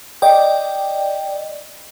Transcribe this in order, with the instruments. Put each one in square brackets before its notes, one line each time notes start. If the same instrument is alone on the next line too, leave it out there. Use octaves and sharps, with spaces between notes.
[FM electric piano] D5 D#5 G5